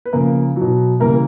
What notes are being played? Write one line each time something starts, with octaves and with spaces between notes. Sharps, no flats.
B4
C#3 F3 A#3 A#4
B2 F#3
C#3 E3 G3 A#3 A#4